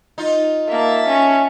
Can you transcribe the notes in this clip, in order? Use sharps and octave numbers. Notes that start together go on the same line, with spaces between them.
D#4 F4
A#3 E5 A5
C#4